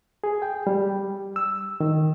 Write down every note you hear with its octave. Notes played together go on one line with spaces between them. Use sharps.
G#4
G5
G3
E6
D#3